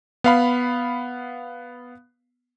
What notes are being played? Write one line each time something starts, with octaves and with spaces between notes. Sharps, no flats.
B3 F5 B5